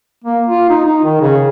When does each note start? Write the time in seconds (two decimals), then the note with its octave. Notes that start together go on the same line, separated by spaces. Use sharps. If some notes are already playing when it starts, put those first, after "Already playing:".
0.24 A#3
0.47 F4
0.70 D#4
0.86 D#4
1.04 D#3
1.21 C#3